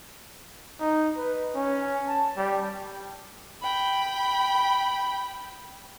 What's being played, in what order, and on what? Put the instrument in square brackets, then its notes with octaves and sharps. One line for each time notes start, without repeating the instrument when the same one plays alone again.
[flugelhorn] D#4
B4
C#4
A5
G3
[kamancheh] G5 B5